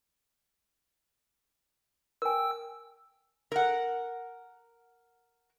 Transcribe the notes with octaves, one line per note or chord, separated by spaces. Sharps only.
A#4 G5 G#5 E6
A#4 F#5